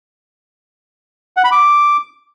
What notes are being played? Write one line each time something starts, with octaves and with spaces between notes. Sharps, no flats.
F#5
B5
D6